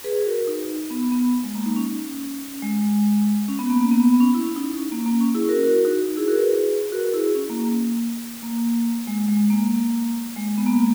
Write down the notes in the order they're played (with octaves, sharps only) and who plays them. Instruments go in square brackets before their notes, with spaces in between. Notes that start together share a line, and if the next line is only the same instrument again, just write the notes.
[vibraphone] G#4 B4
F#4 A#4
D#4
B3
B3
G#3
A#3
D#4
C#4
G#3
C#4
B3
A#3
A#3
B3
B3
C#4
E4
D#4
C#4
A#3
A#3
C#4
E4 G#4
F#4 A#4
F#4 A#4
D#4 F#4
E4 G#4
F#4 A#4
G#4 B4
F#4 A#4
E4 G#4
C#4
A#3
A#3
A#3
G#3
G#3
A#3
G#3
B3
A#3
G#3